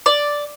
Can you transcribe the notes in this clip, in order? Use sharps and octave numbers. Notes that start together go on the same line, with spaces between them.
D5